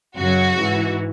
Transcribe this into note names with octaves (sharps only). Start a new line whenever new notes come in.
F#2 C#3 F#3 F#4
G#2 E3